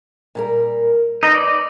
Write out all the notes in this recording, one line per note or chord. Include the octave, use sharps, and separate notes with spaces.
A#2 G3 A#4
D#4 B4 D#5
D5